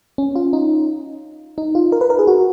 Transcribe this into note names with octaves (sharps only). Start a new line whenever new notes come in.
C#4
F4
D#4
D#4
F4
A#4
B4
A#4
G#4
F#4